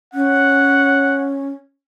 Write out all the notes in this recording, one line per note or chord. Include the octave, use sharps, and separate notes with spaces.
C#4 F#5